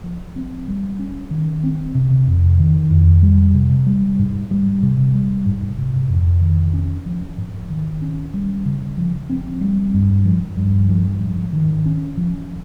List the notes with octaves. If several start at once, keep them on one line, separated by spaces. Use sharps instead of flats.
F3
C4
G3
C#4
D#3
C4
C3
F2
D#3
F2
G3
C3
G3
G#2
G3
C3
G3
G#2
C3
F2
D#3
C#4
F3
G#2
D#3
C#4
G3
C#3
F3
C4
G3
G2
F3
G2
F3
G#2
D#3
C#4
F3